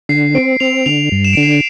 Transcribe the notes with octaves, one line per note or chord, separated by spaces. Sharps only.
D3 C7
C4 D7
C4 F7
D3 F7
G2
E7
D3 D7
C7
D7